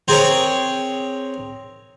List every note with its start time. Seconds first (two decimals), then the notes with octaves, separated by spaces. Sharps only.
0.08 C4 G#4 A#4 C#5